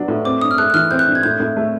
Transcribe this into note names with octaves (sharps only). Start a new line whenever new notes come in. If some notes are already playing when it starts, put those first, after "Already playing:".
Already playing: F#3 B3 D4
A2
C4 D6
G2 D#6
F6
A3 F#6
F#6
E3 F6
C4 G6
F#6
G2
G#6
A2 G6
A2
A3